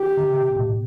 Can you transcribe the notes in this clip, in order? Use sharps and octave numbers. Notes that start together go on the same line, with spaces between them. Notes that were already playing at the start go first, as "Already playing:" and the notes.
Already playing: G4
D3
C#3
B2
A2
B2